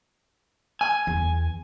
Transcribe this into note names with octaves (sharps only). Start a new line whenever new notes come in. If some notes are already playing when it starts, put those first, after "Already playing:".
G#5
E2